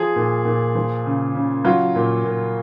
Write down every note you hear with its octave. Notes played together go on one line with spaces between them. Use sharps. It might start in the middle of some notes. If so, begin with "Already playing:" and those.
Already playing: F3 G#4
A#2
A#2
F3
C#3
C#3
F#3 F4
A#2
A#2